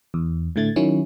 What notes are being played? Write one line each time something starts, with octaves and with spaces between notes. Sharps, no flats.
E2
A2 D3 A3 G#6 A6
D#3 F#3 C#4 E4